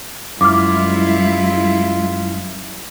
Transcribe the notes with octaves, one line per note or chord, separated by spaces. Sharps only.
F#2 G3 G#3 E4 F4 D6 F6